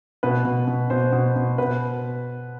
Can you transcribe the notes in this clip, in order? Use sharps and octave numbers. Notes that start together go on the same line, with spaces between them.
B2 B4
B2
B2
B2 C5
B2
B2
B2 B4